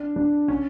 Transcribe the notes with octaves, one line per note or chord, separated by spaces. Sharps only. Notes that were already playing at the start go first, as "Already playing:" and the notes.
Already playing: D4
D4
C#4